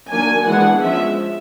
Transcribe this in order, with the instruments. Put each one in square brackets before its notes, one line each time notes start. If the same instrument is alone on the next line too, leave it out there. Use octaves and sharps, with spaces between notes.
[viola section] D#3 F#3 A#3 D4 G#5
E3 G#3 B3 D4 F#5
F3 G#3 C#4 E5